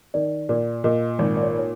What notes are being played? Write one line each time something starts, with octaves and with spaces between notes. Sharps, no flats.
D#3 D5
A#2 D5
A#2 D#5
G#1
D5
C#5
C#5